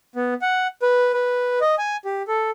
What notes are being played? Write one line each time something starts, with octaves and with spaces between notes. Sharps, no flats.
B3
F#5
B4
B4
D#5
G#5
G4
A4